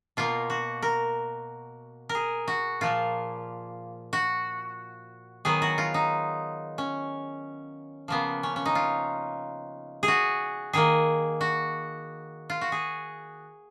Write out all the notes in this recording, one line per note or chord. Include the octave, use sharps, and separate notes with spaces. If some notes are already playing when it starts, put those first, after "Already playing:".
B2 A#3 F4
F#4
A#4
A#4
G#4
F#4
A#2 F3 A#3 F4
F#4
D#3 F#3 B3 G#4
F#4
F4
D#4
C#4
C#3 F3 A#3 B3
C#4
C#4
D#4
F4
G#4
F#4
D#3 A#3 G#4
F#4
F4
F#4
G#4